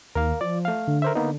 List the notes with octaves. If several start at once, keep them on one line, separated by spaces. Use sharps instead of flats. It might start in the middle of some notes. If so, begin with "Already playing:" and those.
D#2 A#4 F5
F3 D5
A3 F5
D3
A#4 C5 E5
A#3 B3 D#4